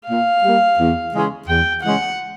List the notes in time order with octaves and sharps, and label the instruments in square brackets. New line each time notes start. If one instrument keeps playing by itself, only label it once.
[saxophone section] A#2 [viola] F5
[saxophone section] G3 A#3
E2
C#3 E3 G#3 C#4
[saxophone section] E2 [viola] G5
[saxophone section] C#3 E3 G#3 C#4 [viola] F#5